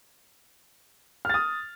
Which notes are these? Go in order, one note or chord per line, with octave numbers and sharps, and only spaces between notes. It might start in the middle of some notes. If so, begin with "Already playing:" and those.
D#6 F6 A6